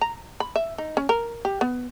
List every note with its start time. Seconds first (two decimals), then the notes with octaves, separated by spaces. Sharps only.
0.01 A#5
0.40 B5
0.56 E5
0.78 D#4
0.97 C#4
1.09 A#4
1.45 G4
1.61 B3